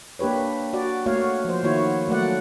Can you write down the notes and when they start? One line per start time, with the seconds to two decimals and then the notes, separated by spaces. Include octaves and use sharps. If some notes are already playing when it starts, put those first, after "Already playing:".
0.19 A#3 D4 G4 B4 C#5
0.73 F#4 D5
1.06 A3 A#3 F#4 C#5 F5
1.45 F3 C5
1.63 D#3 A#3 E4 F#4 C#5
2.08 F#3 A3 A#3 D5 F#5